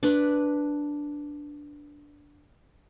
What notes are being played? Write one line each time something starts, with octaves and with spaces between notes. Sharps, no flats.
D4 B4